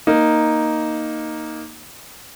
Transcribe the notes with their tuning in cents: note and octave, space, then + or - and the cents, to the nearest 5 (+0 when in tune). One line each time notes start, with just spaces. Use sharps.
A#3 +0 D#4 +0